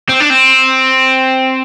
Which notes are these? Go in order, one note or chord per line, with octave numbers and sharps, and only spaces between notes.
C4
D4
C4